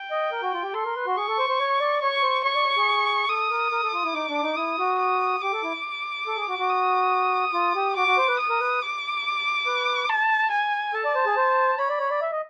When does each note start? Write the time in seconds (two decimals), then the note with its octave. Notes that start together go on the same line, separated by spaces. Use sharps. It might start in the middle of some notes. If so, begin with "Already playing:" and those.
Already playing: G5
0.11 D#5
0.32 A#4
0.43 F#4
0.53 F4
0.63 G4
0.74 A4 C6
0.85 A#4
0.96 B4
1.06 F#4
1.17 G#4 C#6
1.28 A4
1.38 C5
1.49 C5
1.60 C#5
1.80 D5
2.01 C#5 C#6
2.23 C5
2.44 C#5 C#6
2.55 D5
2.65 C#5
2.77 G#4
3.29 A4 D#6
3.51 A#4
3.72 A#4
3.83 A4
3.94 F4
4.04 E4
4.14 D#4 D6
4.29 D4
4.42 D#4
4.57 E4 D#6
4.79 F#4
4.99 D#6
5.42 G4 D6
5.53 A4
5.63 E4
6.27 A4
6.37 G#4
6.48 F#4
6.59 F#4
6.69 D#6
7.54 F4
7.75 G4
7.96 F#4 D6
8.08 F#4
8.18 C5
8.28 B4
8.39 D#6
8.49 A#4
8.61 B4
8.82 D6
9.66 B4
10.09 A5
10.51 G#5
10.94 A4 A5
11.05 D5
11.15 C5
11.26 G#4
11.37 C5
11.79 C#5 B5
11.89 D5
12.00 C#5
12.11 D5
12.22 E5
12.32 D#5